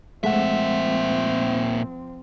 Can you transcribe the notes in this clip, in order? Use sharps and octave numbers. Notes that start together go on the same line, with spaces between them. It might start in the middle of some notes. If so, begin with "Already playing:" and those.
A#2 F3 G#3 A3 C4 E5 F#5